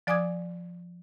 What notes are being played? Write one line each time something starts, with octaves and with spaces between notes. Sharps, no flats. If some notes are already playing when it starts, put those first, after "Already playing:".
F3 D5 G#5 D6 D#6 G#6